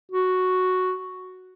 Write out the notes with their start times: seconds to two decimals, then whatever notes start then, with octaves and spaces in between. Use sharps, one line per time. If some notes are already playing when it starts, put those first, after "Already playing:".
0.11 F#4